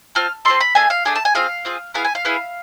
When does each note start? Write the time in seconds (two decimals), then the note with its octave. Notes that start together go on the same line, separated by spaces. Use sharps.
0.15 C4 F4 A4 F6
0.45 C4 F4 A4 C6
0.60 B5
0.75 A3 D4 G#4 G#5
0.90 F5
1.05 A3 D4 G#4 G#5
1.15 A5
1.25 G#5
1.35 C4 F4 G#4 F5
1.65 C4 F4 G#4
1.94 B3 E4 G#4 F5
2.05 G#5
2.15 F5
2.25 B3 E4 G#4